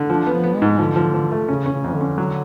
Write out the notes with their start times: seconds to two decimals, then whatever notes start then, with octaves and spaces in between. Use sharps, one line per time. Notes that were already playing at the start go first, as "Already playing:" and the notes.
Already playing: D3
0.09 F3 D4
0.27 B3
0.33 F3
0.44 B3
0.56 G#3
0.62 G#2
0.78 D3 F3
0.96 F3
1.14 F3
1.32 A3
1.48 C#3 C#4
1.66 C#4
1.72 C#3
1.84 F2 F3
1.95 D3
2.01 C#4
2.18 F#3